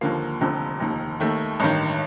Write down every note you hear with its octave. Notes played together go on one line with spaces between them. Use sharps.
D#2 D3 F3 A#3
F1 F2 D3 F3
F1 D#2 D#3
D#2 D#3 A3
A1 G2 D#3